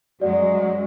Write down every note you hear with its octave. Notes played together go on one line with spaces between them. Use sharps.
F#2 F#3 G#3 F#4 D5